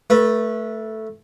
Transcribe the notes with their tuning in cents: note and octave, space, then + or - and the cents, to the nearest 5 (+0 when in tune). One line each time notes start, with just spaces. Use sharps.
A3 +0 B4 -30